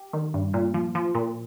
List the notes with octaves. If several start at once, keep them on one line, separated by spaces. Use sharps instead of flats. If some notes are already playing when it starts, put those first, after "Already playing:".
Already playing: G4
D#3
G2
A#2
F3
F3
A#2